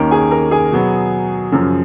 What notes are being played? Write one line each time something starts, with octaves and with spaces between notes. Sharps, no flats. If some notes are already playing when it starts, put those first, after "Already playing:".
Already playing: D#2 D#3 A#3 C#4 A#4 A#5
G#4 G#5
A#4 A#5
G#4 G#5
B2 F#3 B3
F#2 C#3 F3